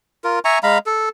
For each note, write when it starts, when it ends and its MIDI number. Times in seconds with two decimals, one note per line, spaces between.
0.24 0.39 65
0.24 0.39 70
0.45 0.59 76
0.45 0.59 80
0.45 0.59 82
0.45 0.59 85
0.63 0.78 56
0.63 0.78 77
0.63 0.78 82
0.63 0.78 83
0.86 1.09 69